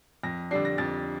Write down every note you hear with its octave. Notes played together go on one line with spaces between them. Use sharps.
F2 A#6
D3 G3 D4 C7
A#6
F2 A6